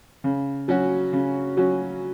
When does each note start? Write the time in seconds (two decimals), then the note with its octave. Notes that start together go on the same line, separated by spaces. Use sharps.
0.24 C#3
0.68 F#3 C#4 F#4
1.13 C#3
1.57 F#3 C#4 F#4